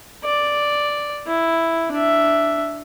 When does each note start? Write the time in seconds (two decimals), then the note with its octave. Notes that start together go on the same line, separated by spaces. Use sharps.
0.25 D5
1.27 E4
1.92 D4 E5